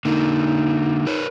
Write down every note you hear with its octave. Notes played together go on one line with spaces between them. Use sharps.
D3 A#3 D#4
A#4 B4 C#5